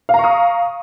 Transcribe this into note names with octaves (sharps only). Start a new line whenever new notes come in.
F5 A#5 C#6 D#6